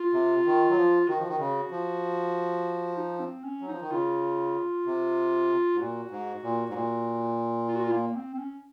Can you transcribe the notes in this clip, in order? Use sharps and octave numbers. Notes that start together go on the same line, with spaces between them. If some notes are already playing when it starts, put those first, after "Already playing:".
Already playing: F4
C3
D#3
F#3
F3
D#3 F#4
F3
D#3
C#3
F3
D#4
C4
C#4
F#3
F3 D#4
D#3
C#3 F4
C3
G#2
A#2 F#4
G#2
A#2
G#2
A#2
F4
F#4
F4
A#3
C4
C4
C#4